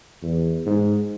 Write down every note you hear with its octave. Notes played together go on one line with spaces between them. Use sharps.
E2
G#2